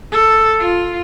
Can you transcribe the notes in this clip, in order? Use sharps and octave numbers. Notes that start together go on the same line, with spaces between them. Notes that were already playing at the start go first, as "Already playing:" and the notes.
A4
F4